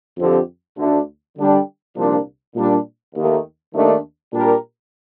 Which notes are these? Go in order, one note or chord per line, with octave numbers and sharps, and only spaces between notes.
F2 D3 F3 C4 G4
D2 D3 A3 D4
D3 G3 D4 G4
C2 A#2 F3 A#3 D4
A#2 G3 D4
D#2 D#3 A3
D#2 D#3 A3 D4
A#2 G3 D4 G4 A#4